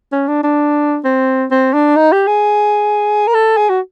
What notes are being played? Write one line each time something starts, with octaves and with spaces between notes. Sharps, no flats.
C#4
D4
D4
C4
C4
D4
D#4
G4
G#4
A#4
A4
G#4
F#4